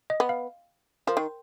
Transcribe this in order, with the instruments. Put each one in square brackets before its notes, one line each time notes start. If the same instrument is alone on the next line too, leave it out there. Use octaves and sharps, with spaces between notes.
[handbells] D#5
[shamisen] B3
[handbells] F5
[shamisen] F3 [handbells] A#4
[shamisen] D#3